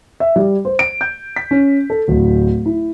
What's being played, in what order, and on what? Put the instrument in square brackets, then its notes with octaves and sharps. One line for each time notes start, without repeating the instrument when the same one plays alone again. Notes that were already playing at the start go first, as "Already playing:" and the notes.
[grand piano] E5
G3
C5
D7
G6
B6
C#4
A4
D1
E4